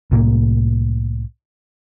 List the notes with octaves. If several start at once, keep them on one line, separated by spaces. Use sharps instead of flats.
C2 A2 A#3